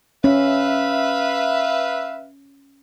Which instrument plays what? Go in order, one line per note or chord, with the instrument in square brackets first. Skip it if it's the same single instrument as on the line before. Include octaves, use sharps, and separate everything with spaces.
[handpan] C#4 [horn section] B4 E5 F5